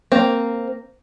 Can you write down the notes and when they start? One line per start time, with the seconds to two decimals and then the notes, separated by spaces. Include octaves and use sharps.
0.12 A#3 C4